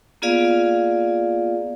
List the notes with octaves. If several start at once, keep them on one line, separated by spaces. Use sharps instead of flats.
A#3 B3 F4 G#4 D5 F5